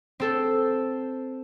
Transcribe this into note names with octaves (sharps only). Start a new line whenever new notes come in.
C4 A4 C5